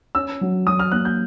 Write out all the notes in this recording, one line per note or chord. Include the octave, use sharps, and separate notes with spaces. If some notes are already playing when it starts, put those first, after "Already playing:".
C#4 E6
F#3
F#3 D#6
F6
A#3 F#6
G6